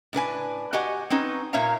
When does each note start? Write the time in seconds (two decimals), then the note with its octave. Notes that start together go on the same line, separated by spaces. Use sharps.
0.13 A2 D4 B4 G#5
0.73 F#4 G4 D#5 F#5 G#5
1.10 C4 C#4 D#4 B4
1.53 A#2 A#3 C#5 E5 F5 A#5